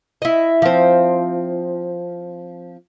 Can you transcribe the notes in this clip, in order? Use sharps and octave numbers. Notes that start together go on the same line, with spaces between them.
E4 D#5
F3 C4